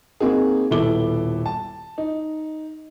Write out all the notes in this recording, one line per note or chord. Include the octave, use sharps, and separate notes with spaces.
A#3 C4 D#4 F#4 G#4
D#1 B2 E4 A4 D6 G7
A5
D#4